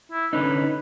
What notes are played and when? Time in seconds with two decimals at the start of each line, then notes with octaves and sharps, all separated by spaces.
0.12 E4
0.33 D3 C#4 D#4 B4